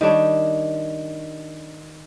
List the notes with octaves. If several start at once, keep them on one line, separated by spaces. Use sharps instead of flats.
D#3 G3 D4 C#5